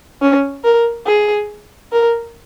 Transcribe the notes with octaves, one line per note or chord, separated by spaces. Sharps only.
C#4
A#4
G#4
A#4